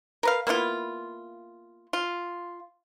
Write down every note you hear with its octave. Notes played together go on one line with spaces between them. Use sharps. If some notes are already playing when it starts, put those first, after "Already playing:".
A#4 B4 F5
A#3 B3 E4 F4
F4